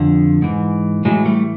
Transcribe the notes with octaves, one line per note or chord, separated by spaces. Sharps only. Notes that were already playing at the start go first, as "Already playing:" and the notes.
Already playing: F2 D3
G#2 E3
A2 E3 F#3 G#3
G3 A3